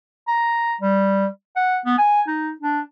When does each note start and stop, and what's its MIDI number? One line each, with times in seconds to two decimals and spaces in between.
0.28 0.75 82
0.81 1.26 55
1.56 1.78 78
1.86 1.96 59
1.98 2.22 80
2.28 2.51 63
2.61 2.81 62